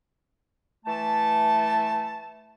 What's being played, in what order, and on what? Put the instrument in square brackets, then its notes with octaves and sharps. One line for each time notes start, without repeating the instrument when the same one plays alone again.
[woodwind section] E3 A3 A5